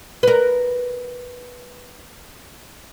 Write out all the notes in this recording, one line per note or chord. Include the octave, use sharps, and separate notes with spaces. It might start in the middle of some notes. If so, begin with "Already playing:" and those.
A#4 B4